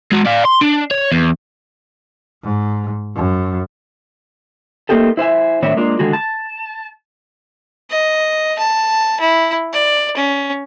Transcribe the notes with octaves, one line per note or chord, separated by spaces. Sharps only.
G#3 F#4
D5 F5
C6
D4
C#5
E2
G#2
F#2
A3 A#3 C4 D#4 G4 A4
E4 C5 E5 G#5
A2 D#3 C4 D4 C#5 E5
G#3 A#3 D4 F4
D3 D#3 G#3 F#4
A5
D#5
A5
E4
D5
C#4